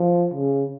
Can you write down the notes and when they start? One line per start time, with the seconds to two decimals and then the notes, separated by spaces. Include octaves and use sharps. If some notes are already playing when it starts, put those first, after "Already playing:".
Already playing: F3
0.34 C#3